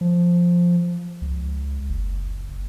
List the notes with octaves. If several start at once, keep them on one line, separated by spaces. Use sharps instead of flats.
F3
C#2
F#1